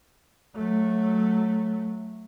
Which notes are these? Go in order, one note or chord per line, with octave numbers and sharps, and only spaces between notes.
F#3 A3